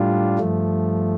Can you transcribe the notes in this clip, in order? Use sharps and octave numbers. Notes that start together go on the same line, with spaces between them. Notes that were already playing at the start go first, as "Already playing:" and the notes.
Already playing: A2 G3 D4 F4
G2 F3 A3